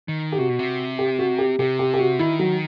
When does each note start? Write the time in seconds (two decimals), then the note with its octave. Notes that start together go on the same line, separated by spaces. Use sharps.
0.08 D#3
0.32 G4
0.38 C3 F#4
0.49 B2
0.59 C3
0.99 G4
1.19 F#4
1.38 G4
1.59 C3 G4
1.79 G4
1.94 G4
1.99 F#4
2.19 D#3 E4
2.39 F#3